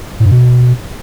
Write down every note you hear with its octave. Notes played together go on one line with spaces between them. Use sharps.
A2
G2
B2